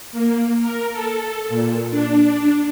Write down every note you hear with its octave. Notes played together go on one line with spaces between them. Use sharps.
A#3
A#4
A4
A#2
D4